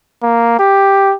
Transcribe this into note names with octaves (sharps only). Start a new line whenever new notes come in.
A#3
G4